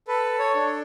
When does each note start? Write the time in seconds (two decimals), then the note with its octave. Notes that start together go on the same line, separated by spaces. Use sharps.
0.08 A4 B4
0.39 C#5
0.55 D4